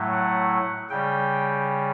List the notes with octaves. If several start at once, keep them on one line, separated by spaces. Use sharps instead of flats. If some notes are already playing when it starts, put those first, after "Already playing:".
Already playing: A2 F#3 A3
F#5
C#3 G3 G5